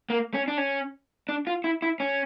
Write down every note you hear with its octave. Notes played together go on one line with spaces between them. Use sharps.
A#3
C#4
D4
C#4
D4
F4
E4
E4
C#4